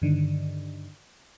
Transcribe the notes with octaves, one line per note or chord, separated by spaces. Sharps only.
G2 D3 D#3